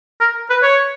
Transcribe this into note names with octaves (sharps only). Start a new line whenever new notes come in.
A#4
B4
C#5